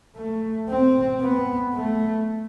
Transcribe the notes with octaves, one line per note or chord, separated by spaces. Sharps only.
A3
C4
B3
A3